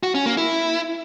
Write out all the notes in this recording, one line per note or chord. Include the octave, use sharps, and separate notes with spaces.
F#4
C#4
A#3
E4